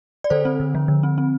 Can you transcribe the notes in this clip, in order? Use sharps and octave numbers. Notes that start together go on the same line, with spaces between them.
D5
D3 A4 C5
C4
D3
F3
D3
C4
C4